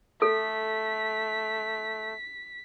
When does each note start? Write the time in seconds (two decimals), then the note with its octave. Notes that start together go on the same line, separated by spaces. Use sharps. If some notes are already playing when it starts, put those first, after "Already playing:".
0.22 A3 A4 B6